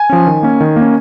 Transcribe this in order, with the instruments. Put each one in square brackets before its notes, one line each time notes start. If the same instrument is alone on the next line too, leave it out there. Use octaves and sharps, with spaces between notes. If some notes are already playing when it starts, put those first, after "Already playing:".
Already playing: [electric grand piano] G#5
F3 C#4
D#3
A#3 C#4
D#3
A#3 C#4